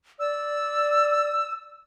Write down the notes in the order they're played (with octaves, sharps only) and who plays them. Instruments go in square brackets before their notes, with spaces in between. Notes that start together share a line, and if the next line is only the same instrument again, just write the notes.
[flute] D5 [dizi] E6